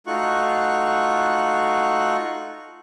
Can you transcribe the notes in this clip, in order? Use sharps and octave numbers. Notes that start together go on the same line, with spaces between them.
A3 D#4 F4 F#4 C#6 F#6